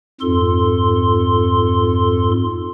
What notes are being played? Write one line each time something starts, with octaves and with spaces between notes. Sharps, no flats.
F2 G#2 F4 A4 C6